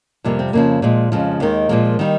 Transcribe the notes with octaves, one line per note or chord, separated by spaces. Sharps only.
F2 C3 G3 A#3
C4
F2 C#3 F3 A#3
A#2 F3 G#3
F2 C#3 F3 G#3
D#2 D#3 G#3
A#2 F3 G#3 A#3
D#3 G3